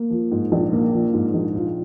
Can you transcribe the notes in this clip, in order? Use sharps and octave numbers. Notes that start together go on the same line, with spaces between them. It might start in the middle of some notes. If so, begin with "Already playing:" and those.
Already playing: A#3
F3
G#2
A#1
A#3
F3
G#2
A#1
F4